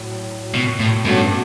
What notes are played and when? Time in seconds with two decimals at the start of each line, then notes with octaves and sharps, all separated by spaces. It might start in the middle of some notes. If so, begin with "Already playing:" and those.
Already playing: A2 F#3
0.54 B2
0.80 A2
1.05 G2 B2 A3 C#4 F#4